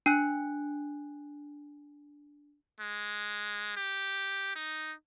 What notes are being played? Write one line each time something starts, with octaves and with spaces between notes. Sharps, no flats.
D4 G#5 F#6
G#3
G4
D#4